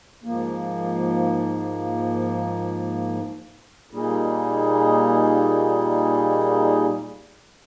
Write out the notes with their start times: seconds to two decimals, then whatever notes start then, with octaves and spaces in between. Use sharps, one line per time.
0.24 G#2 F3 A#3
3.91 A#2 G3 A#3 D#4 G#4